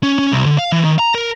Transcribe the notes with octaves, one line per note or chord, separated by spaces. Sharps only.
C#4
C#4
C2
D3
F5
E3
D#3
A#5
A#4